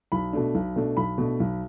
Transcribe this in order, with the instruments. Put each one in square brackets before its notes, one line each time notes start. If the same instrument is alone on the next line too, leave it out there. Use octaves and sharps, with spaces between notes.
[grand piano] B1 B5
B2 A3 D4
B1
B2 A3 D4
B1 B5
B2 A3 D4
B1